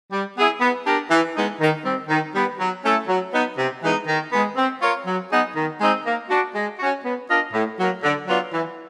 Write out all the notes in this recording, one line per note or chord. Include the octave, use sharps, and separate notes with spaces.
G3
B3 E4 G#4
B3
D4 G4 A#4
E3
G#3 B3 D#4
D#3
G3 C4
D#3
G3 B3
F#3
A3 C#4 E4 A4
F#3
B3 D#4
C3
E3 G#3 B3 D#4
D#3
G#3 B3
C4
F4 A#4 C#5
F#3
B3 D#4 G#4
D#3
G#3 C4 D#4
A#3
D4 F#4
G#3
C#4 F#4
B3
D4 F4 A#4 D#5
A2
F#3 A#3
D3
F#3 B3 D4 F4
E3